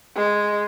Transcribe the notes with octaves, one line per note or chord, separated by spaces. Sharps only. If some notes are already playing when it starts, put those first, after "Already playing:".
G#3